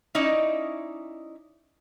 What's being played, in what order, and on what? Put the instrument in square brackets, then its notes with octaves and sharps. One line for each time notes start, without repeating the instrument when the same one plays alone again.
[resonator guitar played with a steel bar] C#4 D#4 E4 D5 D#5